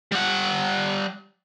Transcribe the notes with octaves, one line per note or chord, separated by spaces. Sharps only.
G3 F#5